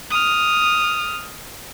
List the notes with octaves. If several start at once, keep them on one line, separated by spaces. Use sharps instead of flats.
D#6 F6